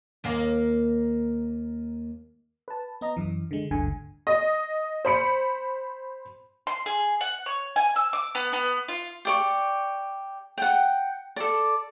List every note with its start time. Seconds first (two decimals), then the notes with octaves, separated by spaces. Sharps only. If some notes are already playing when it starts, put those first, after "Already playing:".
0.24 D#2 A#3 F5
2.68 B4 A5
3.01 B3 D#5 A#5
3.17 F#2 E3
3.51 D3 G#3
3.71 G#1 D2 G2 D3 G#5
4.27 D#5
5.05 C5 B5 C#7
6.67 C6
6.86 G#4
7.21 F#5
7.46 C#5
7.76 G#5
7.96 E6
8.13 D6
8.35 B3
8.53 B3
8.89 F4
9.25 G4 D5 C#6
10.58 F#5 G5
11.36 A4 D5